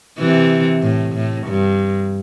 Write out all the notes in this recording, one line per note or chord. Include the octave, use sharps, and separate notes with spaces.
C3 E3
A2
A2
G2